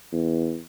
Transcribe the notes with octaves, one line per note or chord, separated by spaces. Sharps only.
E2